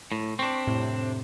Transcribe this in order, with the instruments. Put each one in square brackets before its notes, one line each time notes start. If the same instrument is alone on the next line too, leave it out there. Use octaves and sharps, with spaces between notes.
[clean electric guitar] A2
[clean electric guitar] C4 D4 [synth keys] C#6 B6
[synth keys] F2 A2 C3